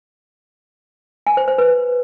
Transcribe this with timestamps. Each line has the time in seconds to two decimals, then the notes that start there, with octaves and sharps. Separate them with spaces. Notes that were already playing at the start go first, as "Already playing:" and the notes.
1.27 G#5
1.37 C5
1.48 C5
1.58 B4